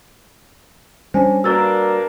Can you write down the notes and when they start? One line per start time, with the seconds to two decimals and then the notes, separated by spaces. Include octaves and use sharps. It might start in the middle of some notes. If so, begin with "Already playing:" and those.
1.14 G3 C#4 D4 C5 G#5
1.44 A#3 D4 F#4 A#4 B4 D5 E6 A6